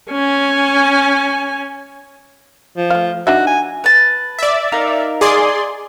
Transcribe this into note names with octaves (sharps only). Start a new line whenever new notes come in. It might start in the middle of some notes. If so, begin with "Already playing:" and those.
C#4 G#5
F3
A3 F5
D4 D#4 F#4 E5
G#5
B4 A5
D5 E5
D#4 A#4 F5
G#4 D5 C6